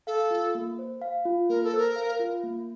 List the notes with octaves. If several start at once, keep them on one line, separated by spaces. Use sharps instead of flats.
A4 F5
F4
A#3
C5
F5
F4
A#3 A#4
A4
A#4 C5
F5
F4
A#3